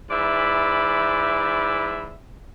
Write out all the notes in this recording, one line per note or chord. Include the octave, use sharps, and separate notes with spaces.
G#2 E3 D5 E5 B5